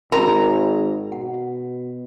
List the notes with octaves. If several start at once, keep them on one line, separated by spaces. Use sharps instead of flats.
G#1 A#4 A#5 B5
B2 F#5